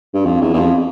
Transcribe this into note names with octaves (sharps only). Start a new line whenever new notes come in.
G2
F2
E2
E2
F2